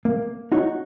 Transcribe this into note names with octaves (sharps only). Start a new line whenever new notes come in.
A#3
D#4 F#4 C#5